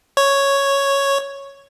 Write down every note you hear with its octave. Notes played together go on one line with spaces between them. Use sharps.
C#5